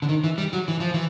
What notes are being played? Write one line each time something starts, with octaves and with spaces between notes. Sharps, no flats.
D3
D#3
E3
G3
F#3
E3
F3
E3